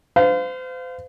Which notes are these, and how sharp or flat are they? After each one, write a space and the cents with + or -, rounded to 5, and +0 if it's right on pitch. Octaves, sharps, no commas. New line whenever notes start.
C5 -40 F5 +0